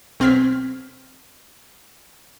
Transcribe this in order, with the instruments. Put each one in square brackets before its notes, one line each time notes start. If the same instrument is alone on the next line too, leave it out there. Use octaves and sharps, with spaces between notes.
[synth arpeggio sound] B1 C4 F6 G#6 B6